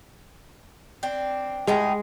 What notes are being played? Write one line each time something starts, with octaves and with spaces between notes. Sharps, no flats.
C4 D4
A2 G#3 G#4 A#5